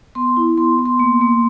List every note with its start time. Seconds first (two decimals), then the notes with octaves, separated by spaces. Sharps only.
0.15 B3 C6
0.37 E4
0.58 B3 C6
0.79 B3
0.86 C6
0.99 A#3
1.21 A#3